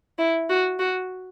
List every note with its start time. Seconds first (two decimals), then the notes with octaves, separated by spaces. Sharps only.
0.19 E4
0.50 F#4
0.79 F#4